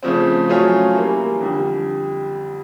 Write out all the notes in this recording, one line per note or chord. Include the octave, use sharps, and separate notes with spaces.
C#3 F3 A3 C4
F#3 A3 C#4 F4 G#4
E3 G3 A#3
F2 D3 G3